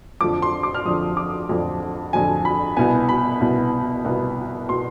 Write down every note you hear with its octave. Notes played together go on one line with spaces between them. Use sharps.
F2 D3 F3 D6
C6
D6
F6
F2 D3 F3 D#6
D6
F2 D3 F3
F2 D3 F3 G#5
B5
C2 B2 B3 G#5
B5
C2 B2 B3
C2 B2 B3
B2 B3 C6